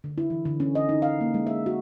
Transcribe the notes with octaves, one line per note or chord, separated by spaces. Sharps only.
D3
E4
E3
D3
C#4
D#5
D#4
F5
A#3
G#3
E5
F#4